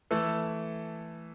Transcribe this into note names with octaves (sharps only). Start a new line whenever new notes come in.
E3 A3 E4 A4